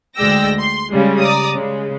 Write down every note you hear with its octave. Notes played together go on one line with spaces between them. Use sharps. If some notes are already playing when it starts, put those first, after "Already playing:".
D2 G#3 D5 G5 E6 A#6
C6
C#3 G3 G#3
D5 A#5 D#6
C#3 G#3